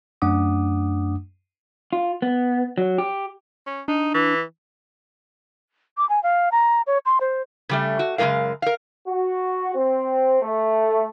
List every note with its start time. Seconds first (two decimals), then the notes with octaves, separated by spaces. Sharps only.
0.22 F#2 A3 D4 F#5 D6 D#6
1.93 F4
2.22 B3
2.78 F#3
2.98 G4
3.67 C#4
3.88 D4 D#4
4.14 E3
5.97 D6
6.09 G#5
6.23 F5
6.52 A#5
6.87 C#5
7.06 C6
7.20 C5
7.69 C#3 G3 A3
7.99 F#4
8.18 F#2 C#3 F3 G#3 A#4 F5
8.62 A#4 F5
9.07 F#4
9.75 C4
10.42 A3